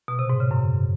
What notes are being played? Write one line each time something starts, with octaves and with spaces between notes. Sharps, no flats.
B2
C3
G#2
C#3
F#2